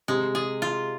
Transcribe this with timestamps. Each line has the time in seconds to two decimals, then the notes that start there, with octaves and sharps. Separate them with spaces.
0.08 C3 G#3
0.35 G#4
0.62 F4